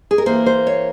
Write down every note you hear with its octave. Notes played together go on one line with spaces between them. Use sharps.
G#4
A#4
E3 A#3 C5
C5
C#5